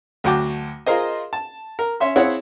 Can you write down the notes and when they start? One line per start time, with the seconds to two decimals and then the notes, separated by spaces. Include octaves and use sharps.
0.24 D2 F#3 F#4 G5 A5 D6
0.86 F4 G#4 A#4 C5 D#5
1.33 A5
1.79 A#4
2.00 C#4 E5 C6
2.16 C4 E4 G#4 C#5 F5 F#5